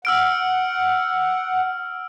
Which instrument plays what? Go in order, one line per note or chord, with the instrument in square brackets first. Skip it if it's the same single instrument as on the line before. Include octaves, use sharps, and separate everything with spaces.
[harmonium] F#5 [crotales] E6 F6 D7